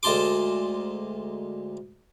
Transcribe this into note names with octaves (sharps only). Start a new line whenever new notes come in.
D2 G#3 A5 C6 D6